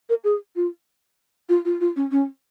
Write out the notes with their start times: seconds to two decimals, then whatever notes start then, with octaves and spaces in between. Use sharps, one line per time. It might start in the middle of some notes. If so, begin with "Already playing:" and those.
0.09 A#4
0.24 G#4
0.56 F4
1.49 F4
1.65 F4
1.81 F4
1.96 C#4
2.11 C#4